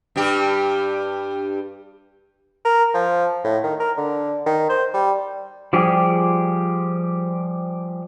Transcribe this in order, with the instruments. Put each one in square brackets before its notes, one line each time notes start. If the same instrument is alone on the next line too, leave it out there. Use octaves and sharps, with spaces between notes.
[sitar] G2 G3 G4
[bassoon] A#4
F3
A2
D#3
A#4
D3
D#3
C5
G3
[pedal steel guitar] F3 G3 G4 G#4